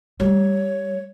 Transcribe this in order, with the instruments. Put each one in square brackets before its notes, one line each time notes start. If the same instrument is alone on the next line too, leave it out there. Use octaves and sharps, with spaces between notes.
[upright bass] G3 [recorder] C#5